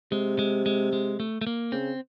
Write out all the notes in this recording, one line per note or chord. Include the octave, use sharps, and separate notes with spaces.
C3 G#3
G#3
G#3
G#3
A3
A3
A#3
C#3 C4